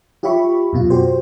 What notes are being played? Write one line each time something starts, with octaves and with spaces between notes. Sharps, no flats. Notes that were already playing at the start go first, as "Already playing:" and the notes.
F4 G4 C#5 E5 B5 C#6
F#2 B2 F4
F#4 G4 C5